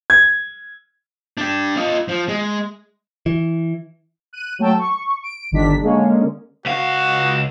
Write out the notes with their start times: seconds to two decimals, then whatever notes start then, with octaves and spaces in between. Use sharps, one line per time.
0.10 G#6
1.38 D4 G4
1.77 F4 D#5
2.08 F3
2.28 G#3
3.26 E3
4.33 F#6 D#7
4.59 F#3 A3 G5 A5 E6
4.79 C#6
5.23 D7
5.51 G1 D3 D#3 G3 D4 B6
5.81 D3 G#3 A#3 C#4
6.66 C#2 F#4 F5